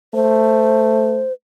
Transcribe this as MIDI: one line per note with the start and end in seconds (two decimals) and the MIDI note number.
0.14 1.24 57
0.14 1.33 72